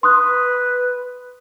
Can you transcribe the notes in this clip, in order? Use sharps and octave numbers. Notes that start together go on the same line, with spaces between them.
B4 C6 D#6 F#6